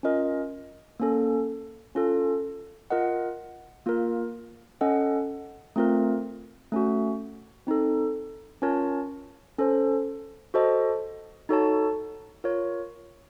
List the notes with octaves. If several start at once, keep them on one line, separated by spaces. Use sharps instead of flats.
C#4 F4 A#4 D#5
A#3 C#4 A4
C#4 F4 A4
F4 A#4 D#5 F#5
A#3 F4 A#4
C#4 A4 D#5 F#5
A3 C4 F4 A#4
A3 C#4 F#4
C4 D#4 A4
C#4 F4 A#4 C#5 A5
C#4 A4 C5
F#4 A4 C5 D#5 A5
D#4 F#4 A4 C#5 A5
F4 A#4 C#5